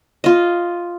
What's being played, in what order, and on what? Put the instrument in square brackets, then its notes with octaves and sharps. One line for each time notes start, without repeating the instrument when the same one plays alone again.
[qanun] F4 D#5